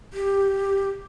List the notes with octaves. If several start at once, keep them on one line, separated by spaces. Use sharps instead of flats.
G4